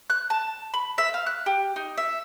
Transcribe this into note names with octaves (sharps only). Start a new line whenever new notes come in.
F#6
A5
B5
E5
F5
F#6
G4
D#4
E5